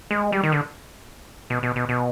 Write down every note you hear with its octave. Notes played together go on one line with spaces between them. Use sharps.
G#3
G3
D#3
D3
B2
B2
B2
B2